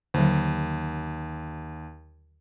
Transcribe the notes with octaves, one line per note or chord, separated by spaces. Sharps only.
D#2 D3 F#3